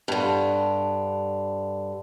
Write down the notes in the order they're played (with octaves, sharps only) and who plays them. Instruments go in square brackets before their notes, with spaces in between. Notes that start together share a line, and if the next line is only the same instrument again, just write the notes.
[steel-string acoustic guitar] G2 D3